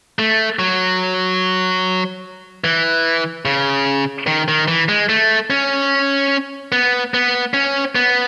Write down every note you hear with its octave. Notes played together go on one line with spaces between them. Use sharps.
A3
F#3
E3
C#3
D#3
D#3
E3
G#3
A3
C#4
B3
B3
C#4
B3